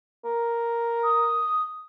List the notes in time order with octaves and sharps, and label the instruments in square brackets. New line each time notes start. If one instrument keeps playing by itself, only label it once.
[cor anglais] A#4
[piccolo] D#6